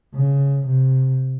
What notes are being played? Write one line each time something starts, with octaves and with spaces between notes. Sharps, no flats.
C#3
C3